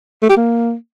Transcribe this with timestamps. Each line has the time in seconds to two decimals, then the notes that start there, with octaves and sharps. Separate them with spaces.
0.22 A3
0.30 G4
0.37 A#3